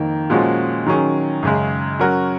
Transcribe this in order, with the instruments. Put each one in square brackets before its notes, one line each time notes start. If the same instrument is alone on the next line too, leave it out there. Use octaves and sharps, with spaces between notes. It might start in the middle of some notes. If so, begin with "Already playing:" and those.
Already playing: [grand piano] F2 D#3 A#3
A#2 F3 G#3 C#4 F#4
D#3 F#3 C#4 G#4
F#2 C#3 G#3
F#3 C#4 F#4 A#4